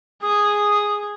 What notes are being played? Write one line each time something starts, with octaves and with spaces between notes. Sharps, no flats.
G#4 D#6